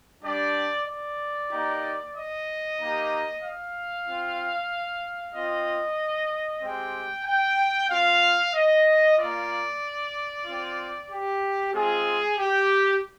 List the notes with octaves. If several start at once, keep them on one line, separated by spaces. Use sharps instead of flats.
G3 D4 G4 D5
D5
A#3 D#4 G4
D#5
A#3 D#4 G4
F5
C4 F4
C4 F4 D#5
G#3 C4 G4 G5
G5
C4 F4 F5
D#5
A#3 F4 D5
C4 F4
G4
G#3 C4 F4 G#4
G4